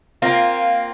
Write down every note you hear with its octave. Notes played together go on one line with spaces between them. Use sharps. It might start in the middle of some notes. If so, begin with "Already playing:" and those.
A#3 C4 F4